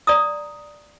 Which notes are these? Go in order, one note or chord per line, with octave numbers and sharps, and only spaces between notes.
D5 A#5 D#6